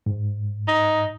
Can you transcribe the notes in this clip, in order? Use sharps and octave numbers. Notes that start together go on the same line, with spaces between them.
G#2
D#4